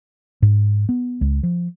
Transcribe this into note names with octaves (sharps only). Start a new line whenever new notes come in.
G#2
B3
C#2
F3